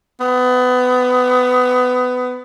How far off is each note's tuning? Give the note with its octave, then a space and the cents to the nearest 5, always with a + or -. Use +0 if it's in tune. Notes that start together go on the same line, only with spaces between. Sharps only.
B3 +25